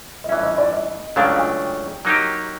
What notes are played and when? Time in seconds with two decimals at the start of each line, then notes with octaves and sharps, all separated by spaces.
0.24 D#5
0.29 G2 E3 A3 C#4 E5
0.43 D#5
0.58 D5
0.73 D#5
1.16 C#2 C#3 F#3 A3 D4 F5
1.38 G5
2.05 F#3 A#3 D#4 G4